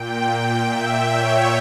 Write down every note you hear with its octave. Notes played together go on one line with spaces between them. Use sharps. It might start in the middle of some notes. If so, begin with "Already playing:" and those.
Already playing: A#2 G5
E5
C#5